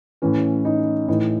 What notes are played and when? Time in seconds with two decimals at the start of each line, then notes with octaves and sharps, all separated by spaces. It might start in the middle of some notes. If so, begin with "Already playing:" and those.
0.22 A2 E3 C#4
0.65 D#4
1.08 A2 E3 D#4